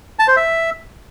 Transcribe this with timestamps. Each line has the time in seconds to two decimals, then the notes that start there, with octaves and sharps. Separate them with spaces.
0.19 A5
0.28 C5
0.37 E5